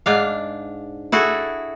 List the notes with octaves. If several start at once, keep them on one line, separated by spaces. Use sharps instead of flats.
G#2 D4 F5
E4 F#4 G#4 A4